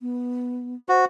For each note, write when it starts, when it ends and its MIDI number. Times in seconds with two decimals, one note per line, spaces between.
0.01 0.75 59
0.89 1.05 66
0.89 1.04 72